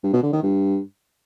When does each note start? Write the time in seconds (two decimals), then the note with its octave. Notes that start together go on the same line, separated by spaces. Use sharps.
0.03 G2
0.13 B2
0.23 D3
0.33 D#3
0.42 G2